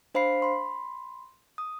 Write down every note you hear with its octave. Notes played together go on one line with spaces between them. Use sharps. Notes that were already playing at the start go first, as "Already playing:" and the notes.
D4 C5 F5 B5 C7
B5 C6
D#6